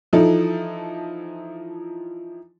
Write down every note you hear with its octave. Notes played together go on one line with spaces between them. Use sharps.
E3 F3 D#4 A4